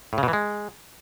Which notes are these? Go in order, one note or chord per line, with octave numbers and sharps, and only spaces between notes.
A2
C#3
B2
E3
G#3